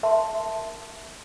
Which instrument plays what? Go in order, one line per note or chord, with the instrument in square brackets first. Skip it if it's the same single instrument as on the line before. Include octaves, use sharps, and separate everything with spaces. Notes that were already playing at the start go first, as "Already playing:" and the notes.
[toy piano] A#4 E5 A5 C6